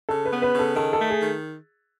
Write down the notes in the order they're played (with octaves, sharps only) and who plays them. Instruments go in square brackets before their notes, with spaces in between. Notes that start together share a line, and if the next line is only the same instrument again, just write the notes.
[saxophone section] C#3 [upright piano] A4
[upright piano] B4
[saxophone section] B3
[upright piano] B4
[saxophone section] C#3 [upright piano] A4
[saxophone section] D#3 [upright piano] A4
[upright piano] A4
[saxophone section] A3
[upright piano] G#4
[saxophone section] D#3